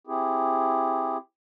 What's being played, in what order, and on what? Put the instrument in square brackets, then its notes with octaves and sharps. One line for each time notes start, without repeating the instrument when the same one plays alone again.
[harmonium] C4 E4 G4 G#4